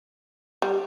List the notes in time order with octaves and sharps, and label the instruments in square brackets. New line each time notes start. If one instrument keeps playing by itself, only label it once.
[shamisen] G3